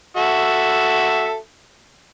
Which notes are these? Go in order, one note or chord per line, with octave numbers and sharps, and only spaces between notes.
F#4 A4 E5